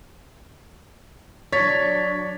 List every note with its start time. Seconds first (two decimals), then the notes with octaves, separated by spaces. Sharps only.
1.52 F#3 D4 C#5 G#6 A6 B6